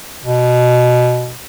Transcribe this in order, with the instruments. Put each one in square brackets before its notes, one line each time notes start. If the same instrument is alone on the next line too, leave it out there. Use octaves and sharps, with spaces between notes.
[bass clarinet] B2